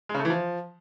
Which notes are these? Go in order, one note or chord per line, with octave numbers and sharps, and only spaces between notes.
G#3
C#3
A3
E3
F3